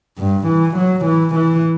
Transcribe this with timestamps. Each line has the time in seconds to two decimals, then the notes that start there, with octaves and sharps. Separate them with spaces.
0.18 G2
0.47 E3
0.77 F#3
1.05 E3
1.35 E3